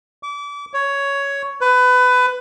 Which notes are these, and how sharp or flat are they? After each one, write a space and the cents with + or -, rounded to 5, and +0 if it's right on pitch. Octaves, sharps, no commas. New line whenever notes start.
D6 -30
C#5 +10
B4 +20